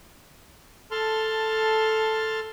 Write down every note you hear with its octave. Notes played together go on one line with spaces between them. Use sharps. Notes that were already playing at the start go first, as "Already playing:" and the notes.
A4 A5 C6 F6